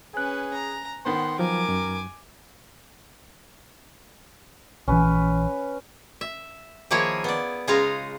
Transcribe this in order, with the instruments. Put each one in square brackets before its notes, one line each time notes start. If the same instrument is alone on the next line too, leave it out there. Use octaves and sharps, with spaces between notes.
[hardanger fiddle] C#4 B4 [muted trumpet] G#4 [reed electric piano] G#5 F#6
[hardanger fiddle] A#5
[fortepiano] D#3 B3 C5 [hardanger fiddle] F#5 [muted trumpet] C6
[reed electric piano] F3 F#3 [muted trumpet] A#4 [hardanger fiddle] G#5 D6
[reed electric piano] F#2
[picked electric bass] A#1 E3 [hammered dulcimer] C#4 B4
[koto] E5
D#3 F3 A#3 E4 G#4 C#5
B3 D5
C#3 G#3 D#4 F4 F5 A#5